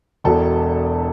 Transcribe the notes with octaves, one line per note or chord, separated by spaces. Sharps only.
E1 E2 B2 A4